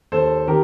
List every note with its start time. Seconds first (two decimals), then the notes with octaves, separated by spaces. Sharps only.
0.12 D#2 A4 C5
0.48 D#3 G4 A#4